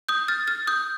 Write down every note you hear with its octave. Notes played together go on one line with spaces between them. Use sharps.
D#6 G6
F6 A6
F6 A6
D#6 G6